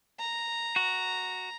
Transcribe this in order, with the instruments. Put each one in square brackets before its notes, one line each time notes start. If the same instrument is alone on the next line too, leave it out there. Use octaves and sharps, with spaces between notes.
[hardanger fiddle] A#5
[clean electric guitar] F#4